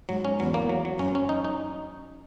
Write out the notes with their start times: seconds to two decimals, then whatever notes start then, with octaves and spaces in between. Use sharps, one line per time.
0.09 G#2 F#3
0.25 C#4
0.40 E2 F#3
0.54 A#3
0.69 F#3
0.85 F#3
0.99 F#2 C#4
1.15 C#4
1.29 D#4
1.44 D#4